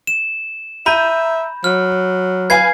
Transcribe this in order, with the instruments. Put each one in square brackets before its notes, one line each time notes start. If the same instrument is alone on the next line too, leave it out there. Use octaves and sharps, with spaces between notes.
[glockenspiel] E7
[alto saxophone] E5 [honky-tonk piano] A#5 G6 D#7 [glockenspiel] B5
[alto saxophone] F#3 [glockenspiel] F6
[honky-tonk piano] B4 F5 G#5 [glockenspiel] G#6 C7